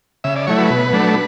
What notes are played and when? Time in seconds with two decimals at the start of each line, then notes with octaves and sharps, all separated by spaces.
0.24 C#3 E5
0.36 D5
0.47 F#3 A3 E4 C#5
0.58 B4
0.70 B2
0.93 F#3 A3 D4